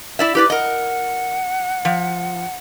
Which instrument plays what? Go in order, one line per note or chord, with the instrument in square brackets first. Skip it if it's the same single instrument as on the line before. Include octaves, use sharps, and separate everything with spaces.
[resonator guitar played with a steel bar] E4 D5 E5
[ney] E4 [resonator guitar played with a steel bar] G4 B4 D5
[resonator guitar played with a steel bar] A#4 D#5 [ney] F#5
[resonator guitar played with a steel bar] F3